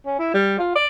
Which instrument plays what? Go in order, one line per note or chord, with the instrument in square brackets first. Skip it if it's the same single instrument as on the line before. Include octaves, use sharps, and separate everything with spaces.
[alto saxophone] C#4
E4
G3
F4
D5